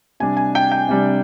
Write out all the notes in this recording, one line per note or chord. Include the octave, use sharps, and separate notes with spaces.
C3 G3 D4 G#5
G#5
G5
G5
C3 G3 D4